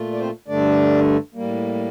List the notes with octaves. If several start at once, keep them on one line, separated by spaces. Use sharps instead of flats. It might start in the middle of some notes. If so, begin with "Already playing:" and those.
Already playing: A#2 A3 F4
D5
C4 C5
G2 D3 A3 D4 D5
A2 G3 A#3